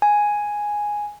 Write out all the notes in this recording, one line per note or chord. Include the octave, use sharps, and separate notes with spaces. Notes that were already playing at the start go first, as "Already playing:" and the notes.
G#5